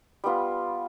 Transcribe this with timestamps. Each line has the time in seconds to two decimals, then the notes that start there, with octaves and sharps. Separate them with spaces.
0.24 G3 B3 F4